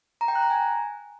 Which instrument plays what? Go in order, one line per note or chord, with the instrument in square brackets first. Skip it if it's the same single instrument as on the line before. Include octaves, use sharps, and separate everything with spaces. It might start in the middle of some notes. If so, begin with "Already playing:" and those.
[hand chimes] A#5
G5
F#6
A#5
G#5